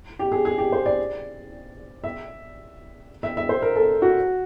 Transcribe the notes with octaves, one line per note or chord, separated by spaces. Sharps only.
G4
G#4
G#4
G4
C5
D5
E5
E5
E5
C5
A#4
A4
F#4